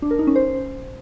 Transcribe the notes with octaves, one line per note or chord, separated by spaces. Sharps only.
D4
A#4
D#4
C#4
C5